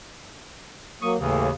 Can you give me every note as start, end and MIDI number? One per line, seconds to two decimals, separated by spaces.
1.02 1.17 54
1.02 1.17 58
1.02 1.12 85
1.02 1.12 87
1.18 1.51 39
1.18 1.48 45
1.18 1.51 49
1.18 1.48 52